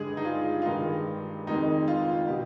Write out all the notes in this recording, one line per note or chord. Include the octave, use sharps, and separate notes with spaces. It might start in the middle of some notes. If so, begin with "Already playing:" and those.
Already playing: G2 D3 G#3 G#4
D#4
F4
F4
G2 D#3 G#3 D#4
F2 D#3 G#3 D#4
F4
B2 G4